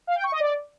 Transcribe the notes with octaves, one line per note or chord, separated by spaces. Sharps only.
F5
G5
C#6
D#5
D5